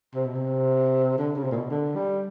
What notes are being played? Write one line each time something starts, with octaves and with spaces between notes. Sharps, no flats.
C3
B2
C3
D3
C#3
C3
A#2
B2
D3
G3